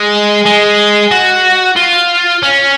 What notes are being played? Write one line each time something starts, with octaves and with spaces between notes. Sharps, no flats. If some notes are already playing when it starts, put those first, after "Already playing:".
Already playing: G#3
G#3
F#4
F4
C#4